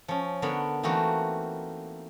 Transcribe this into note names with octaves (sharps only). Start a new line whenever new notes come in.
F3 C#4
D3 B3 A#4 C#5 B5
E3 A3 A#3 C4 D#4 F#4